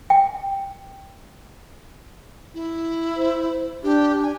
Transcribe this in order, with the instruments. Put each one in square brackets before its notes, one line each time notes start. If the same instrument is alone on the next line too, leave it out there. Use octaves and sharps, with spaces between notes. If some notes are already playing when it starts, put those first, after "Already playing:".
[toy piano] G5
[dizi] E4
[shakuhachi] C5
[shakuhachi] D4 [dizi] G4
[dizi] G#5